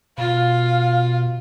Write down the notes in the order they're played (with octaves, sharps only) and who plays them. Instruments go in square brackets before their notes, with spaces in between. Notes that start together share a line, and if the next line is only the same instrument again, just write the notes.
[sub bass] B2 [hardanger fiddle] F4 [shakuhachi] F5